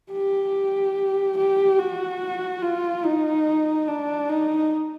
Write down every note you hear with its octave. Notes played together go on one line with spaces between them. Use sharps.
G4
G4
F#4
F4
D#4
D4
D#4